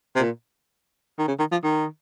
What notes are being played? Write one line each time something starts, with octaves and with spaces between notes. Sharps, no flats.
C3
A#2
D#3
C#3
D#3
F3
D#3